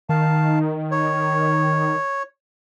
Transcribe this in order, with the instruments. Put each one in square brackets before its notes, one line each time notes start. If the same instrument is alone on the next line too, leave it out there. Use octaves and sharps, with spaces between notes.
[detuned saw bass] D#3 [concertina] F5 A5
[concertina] C#5